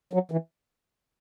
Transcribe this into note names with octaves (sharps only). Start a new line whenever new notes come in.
F#3
E3